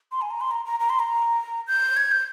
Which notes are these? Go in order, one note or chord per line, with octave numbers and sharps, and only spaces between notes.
C6
G#5
A#5
C6
A#5
A#5
A#5
C6
A#5
G6
G#6
G6